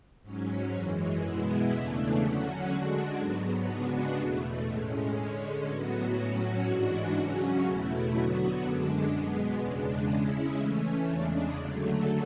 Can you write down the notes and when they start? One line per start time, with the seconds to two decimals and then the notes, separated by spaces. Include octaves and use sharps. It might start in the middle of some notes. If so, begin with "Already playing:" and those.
0.22 G#2 F#3 C#4
0.72 F#2 E3 G#3
1.21 B2 G#3 B3 E4
1.70 E2 C#3 E3 A3 D4
2.19 D3 F#3 C#4 F#4
2.68 D3 G#3 D4 F#4
3.18 G#2 F#3 B3
3.67 C#3 G#3 B3 D4 F#4
4.17 E2 B2 A3
4.66 A2 G#3 C#4
5.15 D3 G#3 C#4
5.64 A2 F#3 B3 F#4
6.14 A2 F#3 C#4 F#4
6.63 G#2 E3 G#3 D4 F#4
7.12 C#3 F#3 C#4 F#4
7.62 E2 B2 A3 E4
8.11 D3 F#3 B3 F#4
8.60 F#2 D3 G#3 D4
9.09 B2 G#3 B3
9.59 E2 C#3 G#3 D4
10.08 C#3 G#3 C#4 E4
10.57 E3 A3 C#4
11.06 E2 C#3 G#3 D4
11.55 D3 F#3 A3